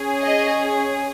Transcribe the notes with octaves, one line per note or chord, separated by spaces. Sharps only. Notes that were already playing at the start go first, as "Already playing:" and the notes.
Already playing: C#4 G#4
D#5